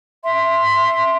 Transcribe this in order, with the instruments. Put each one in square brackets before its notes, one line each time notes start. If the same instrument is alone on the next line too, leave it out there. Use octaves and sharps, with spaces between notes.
[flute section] E5 C6